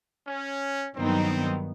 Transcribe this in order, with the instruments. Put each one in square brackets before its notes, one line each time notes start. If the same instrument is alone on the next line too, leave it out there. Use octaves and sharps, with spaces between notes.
[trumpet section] C#4
[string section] G2 D#3 F#3 B3 D#4 [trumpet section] C4